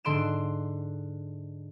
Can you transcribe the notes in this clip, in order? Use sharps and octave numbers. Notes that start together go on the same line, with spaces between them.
G#2 D3 C6 D7 E7